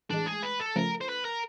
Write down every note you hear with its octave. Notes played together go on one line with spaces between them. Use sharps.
A2 E3 G#3 D4
G#4
B4
A4
C#3 F3 A3 A#4
C5
B4
A#4